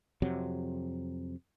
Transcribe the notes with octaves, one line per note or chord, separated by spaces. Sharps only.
F2 C3 F#3